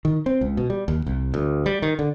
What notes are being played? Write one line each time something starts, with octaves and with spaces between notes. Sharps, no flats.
D#3
C4
C#2
B2
G3
D#2
C2
D2
G3
D#3
D3